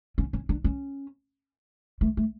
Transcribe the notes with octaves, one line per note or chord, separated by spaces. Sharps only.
C#4
C#4
D4
C#4
A3
A3